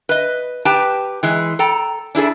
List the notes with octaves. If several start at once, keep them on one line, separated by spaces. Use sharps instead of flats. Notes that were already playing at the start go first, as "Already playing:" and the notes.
B4 D#5
G4 B4 G5 A5
E3 G#3
A4 G5 A#5
D4 E4 G#4 A4